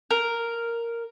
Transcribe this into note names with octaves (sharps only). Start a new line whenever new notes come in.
A#4